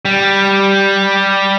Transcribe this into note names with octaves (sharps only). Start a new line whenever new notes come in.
G3